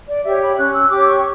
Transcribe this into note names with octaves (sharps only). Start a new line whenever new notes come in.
D5
G4 C#5 E5
B5
C#4 F#6
E6
G4 C#5 D6
C#6